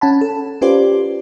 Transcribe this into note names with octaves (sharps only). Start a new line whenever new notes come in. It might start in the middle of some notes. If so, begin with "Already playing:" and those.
C#4 F#5 A5 B5
A4
C#4 F4 G4 B4 C5 D5